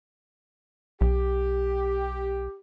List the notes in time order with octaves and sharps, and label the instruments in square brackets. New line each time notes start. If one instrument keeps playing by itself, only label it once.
[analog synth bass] B1 [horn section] G4